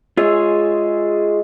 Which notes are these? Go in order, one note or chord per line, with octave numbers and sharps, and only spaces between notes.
G#3 F4 G#4 C#5 E5